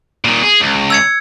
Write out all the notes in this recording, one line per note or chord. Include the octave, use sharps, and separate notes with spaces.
A#2 D#3
G#4
C#2
E6 G#6 C#7